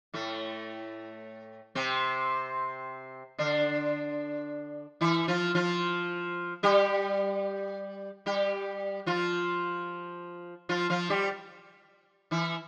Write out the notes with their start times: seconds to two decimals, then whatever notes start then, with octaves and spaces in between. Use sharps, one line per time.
0.14 A2 A3
1.75 C3 C4
3.38 D3 D4
5.01 E3 E4
5.28 F3 F4
5.55 F3 F4
6.63 G3 G4
8.26 G3 G4
9.06 F3 F4
10.69 F3 F4
10.90 F3 F4
11.10 G3 G4
12.31 E3 E4